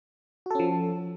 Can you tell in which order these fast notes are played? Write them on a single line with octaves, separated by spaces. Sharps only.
F#4 A4 C#4 F3